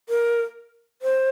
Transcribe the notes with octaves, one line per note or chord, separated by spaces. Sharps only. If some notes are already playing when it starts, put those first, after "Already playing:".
A#4
C5